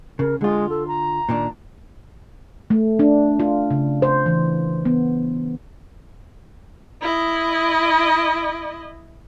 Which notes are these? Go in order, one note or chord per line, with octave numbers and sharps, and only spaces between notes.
C#3 A#4
D3 G#3 F4
A4
A#5
A#2 D#3 D4
A3
D4
F4
C#3
C5
E3
B3
E4 D#5